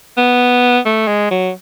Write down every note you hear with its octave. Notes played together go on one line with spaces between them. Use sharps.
B3
A3
G#3
F#3